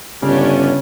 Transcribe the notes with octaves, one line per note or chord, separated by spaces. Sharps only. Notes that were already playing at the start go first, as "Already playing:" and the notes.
G1 C#3 C#4 D4 G4